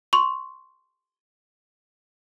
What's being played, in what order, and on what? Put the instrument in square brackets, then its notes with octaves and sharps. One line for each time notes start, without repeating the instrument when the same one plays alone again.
[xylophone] C6 C#6